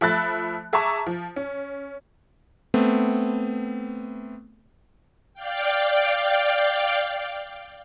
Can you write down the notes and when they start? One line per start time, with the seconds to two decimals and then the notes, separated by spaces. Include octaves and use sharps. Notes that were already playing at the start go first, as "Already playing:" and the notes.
0.01 F3 A3 E5 B5 F#6 A6
0.73 G#4 E5 A5 A#5 C#6 D6
1.07 F3
1.36 C#4
2.74 A3 B3 C4
5.34 D5 F5 G5